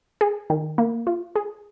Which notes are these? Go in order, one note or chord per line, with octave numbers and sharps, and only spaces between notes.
G#4
D#3
A#3
F4
G#4